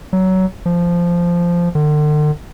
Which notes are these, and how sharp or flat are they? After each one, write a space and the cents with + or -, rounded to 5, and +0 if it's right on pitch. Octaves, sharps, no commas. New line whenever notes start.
F#3 +20
F3 -10
D3 +40